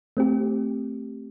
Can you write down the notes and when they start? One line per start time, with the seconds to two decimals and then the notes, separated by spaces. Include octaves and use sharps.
0.17 A3 C4 G4